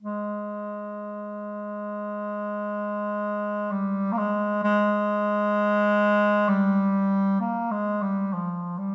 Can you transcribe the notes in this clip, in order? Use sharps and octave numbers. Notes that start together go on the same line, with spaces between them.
G#3
G3
A#3
G#3
G#3
G3
A#3
G#3
G3
F3
G3